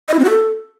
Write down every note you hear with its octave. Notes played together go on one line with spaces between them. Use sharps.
D#5
E4
C4
F#4
A4